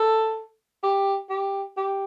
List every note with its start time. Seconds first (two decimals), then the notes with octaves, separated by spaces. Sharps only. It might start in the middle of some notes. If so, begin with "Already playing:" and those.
Already playing: A4
0.83 G4
1.30 G4
1.77 G4